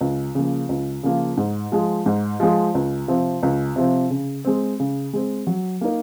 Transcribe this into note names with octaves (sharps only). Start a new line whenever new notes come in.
C#2
C#3 F3 A#3
C#2
C#3 F3 A#3
G#2
F3 G#3
G#2
F3 G#3
C#2
C3 F3 C4
C#2
C3 F3 C4
C#3
G#3 C4
C#3
G#3 C4
F#3
A#3 D#4 A#4